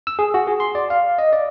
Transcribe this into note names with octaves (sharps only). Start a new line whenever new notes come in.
E6
G#4
F#4
G#4
C6
D5
F5
D#5
D5